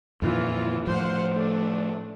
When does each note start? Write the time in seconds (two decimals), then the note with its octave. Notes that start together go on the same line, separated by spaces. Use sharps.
0.22 F2 A#2 D#3 E3 F4
0.87 A2 F3 C5 F5 F#5
1.33 A3 D4